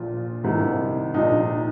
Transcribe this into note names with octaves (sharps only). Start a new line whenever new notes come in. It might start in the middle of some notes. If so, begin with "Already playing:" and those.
Already playing: A#1 A#2 F3 F4
C2 C3 D#3
A#1 A#2 F3 D#4